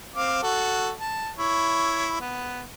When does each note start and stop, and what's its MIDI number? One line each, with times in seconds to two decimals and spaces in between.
0.16 0.40 60
0.16 0.40 77
0.16 0.40 86
0.43 0.91 66
0.43 0.91 69
1.00 1.30 81
1.38 2.17 64
1.38 2.17 73
2.21 2.63 59